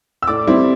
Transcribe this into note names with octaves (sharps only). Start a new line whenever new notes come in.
E6
A2 D5 D6
G3 C4 E4